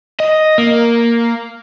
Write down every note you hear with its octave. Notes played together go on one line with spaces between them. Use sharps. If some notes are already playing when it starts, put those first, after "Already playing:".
D#5
A#3